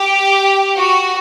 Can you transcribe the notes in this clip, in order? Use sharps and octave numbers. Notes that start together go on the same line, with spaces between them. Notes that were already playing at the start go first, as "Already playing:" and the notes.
Already playing: G4
F#4